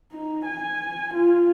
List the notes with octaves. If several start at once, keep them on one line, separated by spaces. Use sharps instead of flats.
D#4
G#5
F4